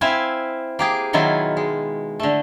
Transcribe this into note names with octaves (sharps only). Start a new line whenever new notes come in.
C4 E4 E5 F5 G#5
A#3 G4 G#4
B2 D#3 F#3 E4 F4 G#5
G#3
D3 A3